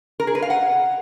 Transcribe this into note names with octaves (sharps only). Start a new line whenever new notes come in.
A#4
G#4
B4
F5
F#5